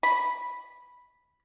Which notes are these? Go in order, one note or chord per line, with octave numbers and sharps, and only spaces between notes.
B5